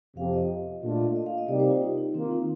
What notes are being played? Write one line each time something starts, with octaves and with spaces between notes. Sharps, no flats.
F2 C3 F3 C4 G4 F5
D#5
A#2 A3 D4 F4
D#5
F5
D#5
C3 G3 A#3 D#4 G4 D5
C5
F4
D#4
D#4
D#3 A#3 C4 F4
D#4